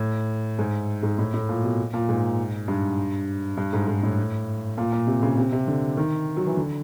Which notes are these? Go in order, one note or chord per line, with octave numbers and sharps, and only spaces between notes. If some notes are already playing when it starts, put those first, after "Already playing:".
Already playing: A2
G#2
G#2
A2
A2
A#2
B2
A#2
G#2
G2
G2
G#2
G#2
A2
A#2
A#2
C3
C#3
C3
C3
D3
D#3
F#3
E3
D3